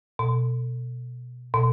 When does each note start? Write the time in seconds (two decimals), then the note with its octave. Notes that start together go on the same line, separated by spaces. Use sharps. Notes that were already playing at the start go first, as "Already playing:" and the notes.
0.19 B2
1.54 B2